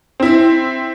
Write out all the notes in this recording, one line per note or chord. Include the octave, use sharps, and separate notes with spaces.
C4 E4